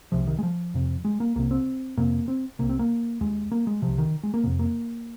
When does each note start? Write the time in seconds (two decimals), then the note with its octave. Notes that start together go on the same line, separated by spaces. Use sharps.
0.12 C2 C3 F3
0.27 D#3
0.39 G#3
0.43 F3
0.74 F2 C3
1.05 G#3
1.20 A#3
1.36 C2 C3 A#3
1.51 C4
1.97 F2 C3 A#3
2.28 C4
2.59 C2 C3 A#3
2.69 C4
2.79 A#3
3.21 D#2 G#3
3.52 A#3
3.67 G#3
3.82 C2 C3 F3
3.98 D#3
4.23 G#3
4.34 A#3
4.43 F2 C3
4.59 A#3